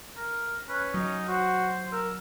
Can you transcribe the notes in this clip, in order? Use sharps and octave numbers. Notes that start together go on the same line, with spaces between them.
A#4
C#4 B4
F#3 D#4
F#4 C5
A#4 E6